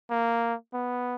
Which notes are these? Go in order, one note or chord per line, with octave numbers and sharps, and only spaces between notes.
A#3
B3